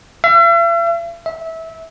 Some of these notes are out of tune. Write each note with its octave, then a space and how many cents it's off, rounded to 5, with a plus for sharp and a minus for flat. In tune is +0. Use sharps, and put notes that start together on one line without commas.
E5 +45
E5 -20